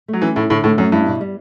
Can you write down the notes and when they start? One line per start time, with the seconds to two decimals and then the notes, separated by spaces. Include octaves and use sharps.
0.08 A3
0.13 F#3
0.22 E3 C#4
0.36 A2 E4
0.50 A2 D3
0.64 A2 A3
0.78 F#2 C#4
0.92 G2 E4
1.06 B2
1.21 G3